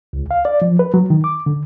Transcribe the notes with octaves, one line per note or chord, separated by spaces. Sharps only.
C#2
F5
D5
F3
B4
F#3
D#3
D6
D3